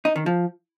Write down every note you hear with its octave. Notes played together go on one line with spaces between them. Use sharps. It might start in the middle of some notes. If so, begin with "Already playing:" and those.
D#4
D#3
F3